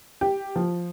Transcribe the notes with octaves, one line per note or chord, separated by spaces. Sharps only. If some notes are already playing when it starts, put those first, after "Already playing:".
G4
F3